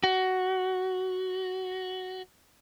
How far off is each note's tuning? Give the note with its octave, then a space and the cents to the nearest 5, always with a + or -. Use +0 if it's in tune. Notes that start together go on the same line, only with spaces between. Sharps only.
F#4 +10